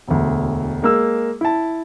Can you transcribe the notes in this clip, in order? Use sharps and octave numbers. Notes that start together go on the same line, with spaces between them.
E1 D2
G#3 A#3 E6
E4 A5